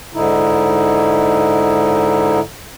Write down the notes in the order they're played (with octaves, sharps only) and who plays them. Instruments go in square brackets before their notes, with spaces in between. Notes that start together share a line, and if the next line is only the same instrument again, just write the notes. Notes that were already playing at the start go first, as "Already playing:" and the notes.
[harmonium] G#2 D3 D#4 E4